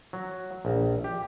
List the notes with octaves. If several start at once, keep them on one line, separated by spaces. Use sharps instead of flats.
F#3
A#1
G4